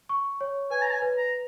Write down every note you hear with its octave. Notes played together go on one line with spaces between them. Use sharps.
C#6
C#5
B4 G#5
A#5
G#5
B4
A#5